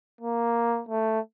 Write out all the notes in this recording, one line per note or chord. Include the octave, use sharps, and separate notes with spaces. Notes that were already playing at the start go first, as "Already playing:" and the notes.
A#3
A3